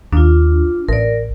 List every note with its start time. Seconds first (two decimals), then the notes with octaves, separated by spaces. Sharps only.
0.13 D#2 D4 F4
0.89 A1 A#4 D5